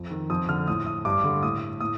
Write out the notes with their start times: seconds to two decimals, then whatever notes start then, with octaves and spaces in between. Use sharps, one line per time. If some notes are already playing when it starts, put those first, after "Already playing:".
Already playing: F2
0.11 D#3
0.30 F2 D#6
0.48 D3 F6
0.68 A2 D#6
0.86 D#6
1.05 G2 D6
1.24 D3
1.43 A2 D#6
1.81 A2 D#6